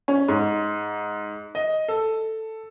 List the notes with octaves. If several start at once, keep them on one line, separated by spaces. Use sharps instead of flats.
C#4
G#2
D#5
A4